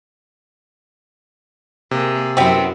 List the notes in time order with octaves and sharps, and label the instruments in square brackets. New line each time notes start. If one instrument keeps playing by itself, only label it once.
[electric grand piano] C3 [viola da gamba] A#3 G#4
[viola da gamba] F#2 F#3 E4 [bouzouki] B3 C4